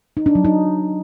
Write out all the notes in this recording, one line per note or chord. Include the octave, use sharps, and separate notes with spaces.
D#4
D4
F#3
D#4